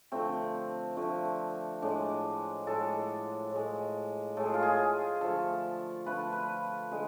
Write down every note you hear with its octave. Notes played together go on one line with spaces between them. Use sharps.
D3 F3 A3 C4
D3 F3 A3
A2 G#3 D4
A2 G#3 A4
A2 G#3
A2 G#3 A4
G#4
F4
G#4
D3 F3 A3 A4
D3 F3 A3 B4
B4
D3 G#3